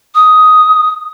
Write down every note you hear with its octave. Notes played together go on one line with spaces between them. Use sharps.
D#6